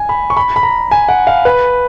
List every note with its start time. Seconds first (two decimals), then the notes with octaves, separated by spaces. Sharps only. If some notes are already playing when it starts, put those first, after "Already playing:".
Already playing: G#5
0.09 B5
0.30 C#6
0.37 B5
0.56 B5
0.63 A#5
0.91 G#5
1.09 F#5
1.27 F5
1.45 B4